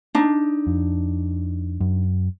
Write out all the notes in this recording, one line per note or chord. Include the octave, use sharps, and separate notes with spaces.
D4 D#4
F2
F#2